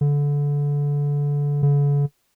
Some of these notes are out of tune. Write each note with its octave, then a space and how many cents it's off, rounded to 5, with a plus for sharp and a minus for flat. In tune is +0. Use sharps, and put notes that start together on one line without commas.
D3 -25
D3 -45